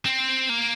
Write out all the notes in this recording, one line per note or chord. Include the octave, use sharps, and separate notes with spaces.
C4
A#3